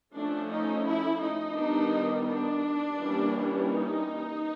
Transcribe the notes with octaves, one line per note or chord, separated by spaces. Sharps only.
F3 A3 C#4 D4
D#4
E4
D#4
D#3 G3 B3 D4
D4
E3 G3 A#3 C#4
D#4